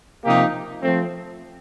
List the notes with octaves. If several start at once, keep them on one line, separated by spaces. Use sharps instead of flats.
C3 F3 A#3 D#4 G4
F3 A3 C4